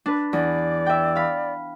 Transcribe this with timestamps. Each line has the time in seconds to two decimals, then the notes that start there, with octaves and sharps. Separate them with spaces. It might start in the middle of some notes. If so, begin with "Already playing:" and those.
0.06 D4 B4
0.33 E2 D5
0.86 E5 G5
1.16 F5 B5